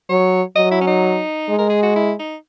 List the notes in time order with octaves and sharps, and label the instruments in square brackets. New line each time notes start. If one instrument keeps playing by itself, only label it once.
[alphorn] F#3 [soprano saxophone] C#5
[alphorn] F#3 [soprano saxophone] D#5
[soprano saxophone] E4
C#4
D#4
[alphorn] G#3
[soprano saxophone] A#4
G#4
F#4
E4
D#4